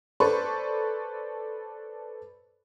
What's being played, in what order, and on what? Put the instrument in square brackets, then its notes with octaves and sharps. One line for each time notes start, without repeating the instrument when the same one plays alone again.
[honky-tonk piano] A4 B4 C5 D5 B5 C#6